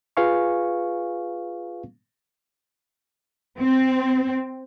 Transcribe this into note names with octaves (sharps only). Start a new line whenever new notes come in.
F4 G#4 B4 F5 G#5 C#6
C4